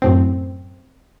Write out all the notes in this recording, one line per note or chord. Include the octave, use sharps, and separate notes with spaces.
F#2 A2 C4